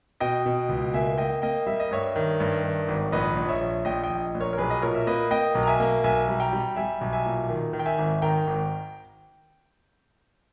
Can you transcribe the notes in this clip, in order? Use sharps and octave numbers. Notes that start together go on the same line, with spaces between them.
B2 D#5 G5
B2
C#2
A#3 E5 G#5
A#3 D#5 G5
A#3 D#5 G5
G3 E5
D#5
G2 C#5 E5
D#3
G2
D#3
G#1
A#1 B4 D#5
A#1
C#5 E5
A#1
A#1 D#5 G5
D#5 G5
A#1
A#1
A#4 C#5
A#4
B1 G#4 B4
D#5
A#2 A#4 C#5
E5
A#3 B4 D#5
A#3 D#5 G5
B1
A#5
E5 G#5
A#3
B1 E5 G#5
G3
G5 A#5
G3
G3 E5 G#5
B1
E5 G#5
A#2
D#3
D#3
G5
E5 G#5
G#1
D#3 G5 A#5
G#1